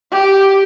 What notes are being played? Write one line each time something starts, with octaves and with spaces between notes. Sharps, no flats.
G4